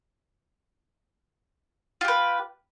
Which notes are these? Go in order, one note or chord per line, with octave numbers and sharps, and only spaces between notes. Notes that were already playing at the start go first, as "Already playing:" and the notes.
F4 G4 B4